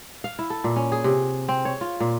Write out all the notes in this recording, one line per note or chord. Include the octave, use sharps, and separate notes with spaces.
F5
E4
A4
A#2
C#4
G#4
C3
C4
C#5
F4
A#2